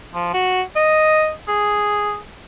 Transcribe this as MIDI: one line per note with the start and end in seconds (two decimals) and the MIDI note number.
0.14 0.31 53
0.34 0.62 66
0.76 1.32 75
1.48 2.18 68